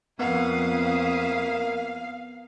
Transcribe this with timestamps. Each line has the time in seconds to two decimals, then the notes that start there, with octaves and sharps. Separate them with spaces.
0.19 F2 A#3 B3 E4 B4 F5 F#5 D#6